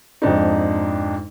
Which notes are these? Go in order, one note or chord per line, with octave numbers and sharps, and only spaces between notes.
F2 G#2 D4 D#4